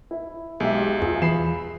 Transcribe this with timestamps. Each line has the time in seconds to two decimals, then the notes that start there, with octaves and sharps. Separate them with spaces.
0.11 E4
0.60 B1 G#3 G4 E5
1.02 E2 F4 G#4
1.22 E3 B5 C7 E7